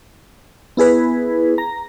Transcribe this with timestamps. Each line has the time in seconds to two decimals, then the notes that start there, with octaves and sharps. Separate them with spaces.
0.77 B3 E4 G#4 B4
1.58 A#5